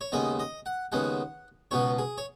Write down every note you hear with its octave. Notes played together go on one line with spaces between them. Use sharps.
C#5
D#2 C#3 G#3 B3 D#5
D#5
F#5
D#2 C#3 G#3 B3 F#5
C#2 B2 B3 C#5
G#4
C#5